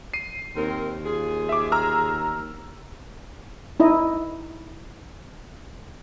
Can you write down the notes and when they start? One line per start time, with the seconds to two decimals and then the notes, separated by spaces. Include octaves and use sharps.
0.14 C7 D#7
0.56 D#2 C4 A#4
1.06 F4 G#4
1.49 E5 D6
1.72 A#5 E6 F6
3.80 D#4 E4 D#5